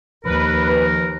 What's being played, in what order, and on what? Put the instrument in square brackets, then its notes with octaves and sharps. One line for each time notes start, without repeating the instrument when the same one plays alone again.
[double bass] D#2 [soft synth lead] F3 [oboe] A#4 [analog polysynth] B4